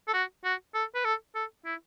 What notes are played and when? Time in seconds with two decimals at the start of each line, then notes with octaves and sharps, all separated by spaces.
0.08 A4
0.14 F#4
0.44 F#4
0.74 A4
0.95 B4
1.05 A4
1.35 A4
1.65 E4